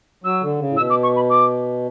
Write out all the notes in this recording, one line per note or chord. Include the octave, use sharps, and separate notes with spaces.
F#3 E6
D3
C#3
A2
B2 E6
D6
C#6
B5
D6